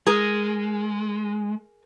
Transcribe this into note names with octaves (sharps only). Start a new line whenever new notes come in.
G#3 G#4 A#4